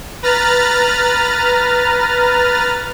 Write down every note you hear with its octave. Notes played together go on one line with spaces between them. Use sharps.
B4 A#5 F6 A6